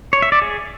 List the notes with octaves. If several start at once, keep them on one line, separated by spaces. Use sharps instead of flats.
C#5
E5
D5
G#4